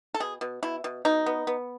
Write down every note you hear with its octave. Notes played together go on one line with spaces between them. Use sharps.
A4
B2 G#4
B2
B2 E4
B2
B2 D#4
B3
B3